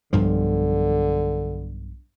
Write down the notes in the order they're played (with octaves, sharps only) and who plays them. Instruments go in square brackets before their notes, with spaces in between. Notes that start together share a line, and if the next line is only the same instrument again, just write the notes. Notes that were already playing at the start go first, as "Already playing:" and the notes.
[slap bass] B1 G2 F3 [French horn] D3